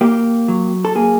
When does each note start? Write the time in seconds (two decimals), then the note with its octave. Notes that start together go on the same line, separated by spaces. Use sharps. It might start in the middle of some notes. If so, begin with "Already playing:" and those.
0.01 A#3 G4
0.48 F#3
0.85 A4
0.95 A#3 G#4